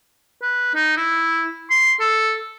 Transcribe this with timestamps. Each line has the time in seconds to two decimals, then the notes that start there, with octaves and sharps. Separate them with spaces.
0.42 B4
0.75 D#4
0.97 E4
1.70 C6
2.00 A4